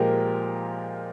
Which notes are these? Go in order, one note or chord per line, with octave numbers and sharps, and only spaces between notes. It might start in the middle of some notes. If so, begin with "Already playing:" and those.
Already playing: A#2 F3 G#3 G4 A#4